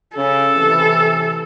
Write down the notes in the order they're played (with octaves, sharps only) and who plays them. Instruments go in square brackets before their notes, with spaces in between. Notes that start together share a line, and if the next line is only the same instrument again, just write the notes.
[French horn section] C#3 [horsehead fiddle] A4
[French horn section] A2 C3 E3